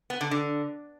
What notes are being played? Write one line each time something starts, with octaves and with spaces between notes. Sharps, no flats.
B3
D3
D3